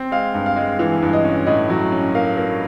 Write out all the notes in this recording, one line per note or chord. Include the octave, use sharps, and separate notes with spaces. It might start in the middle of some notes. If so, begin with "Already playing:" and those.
Already playing: C4
G#3 F5
G2
F5
G#3
E3
G2
D#5
C#4
A2 D#5
F#3
C#4
A#3 F5
A#3